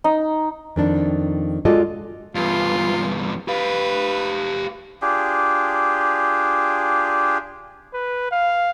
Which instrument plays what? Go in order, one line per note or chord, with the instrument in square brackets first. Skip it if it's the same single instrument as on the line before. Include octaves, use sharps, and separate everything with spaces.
[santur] D#4
[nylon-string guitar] F2 D#3 D4
G#3 F4 F#4 A4 D5 D#5
[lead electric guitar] E2 G2 [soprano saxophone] F4
[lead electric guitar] G4 F5 [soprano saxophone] B4
[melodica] D4 F4 G4 G#4
[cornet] B4
F5